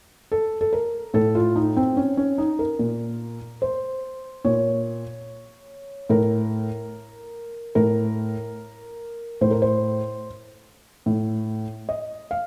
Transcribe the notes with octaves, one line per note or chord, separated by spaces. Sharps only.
A4
A4
A#4
A2 A4
F4
D#4
C4
C#4
C#4
D#4
A#4
A#2
C5
A#2 C#5
A2 A#4
A2 A#4
A2 C5
A#4
C5
A2
D#5
F5